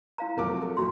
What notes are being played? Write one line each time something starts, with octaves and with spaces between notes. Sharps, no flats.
E4 F5 A#5
C3 F3 F#3 A3 A#4 D6
A4
B1 A#2 F#4 A#5 C6